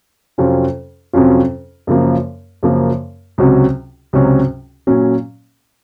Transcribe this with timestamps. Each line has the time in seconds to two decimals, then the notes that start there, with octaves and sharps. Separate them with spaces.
0.38 F2 C3 F#3 C#4 F4
1.13 F2 C3 F#3 C#4 F4
1.87 F#2 C#3 F3 A#3
2.63 F#2 C#3 F3 A#3
3.38 C#2 C3 F#3 C#4 F#4
4.13 C#2 C3 F#3 C#4 F#4
4.87 A#2 F#3 C#4